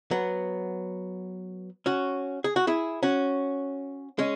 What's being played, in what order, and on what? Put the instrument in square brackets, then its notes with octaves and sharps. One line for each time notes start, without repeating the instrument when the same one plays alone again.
[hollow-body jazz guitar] F#3 B3
C#4 F#4
G#4
F#4
E4 G#4
C#4 F#4
G#3 C#4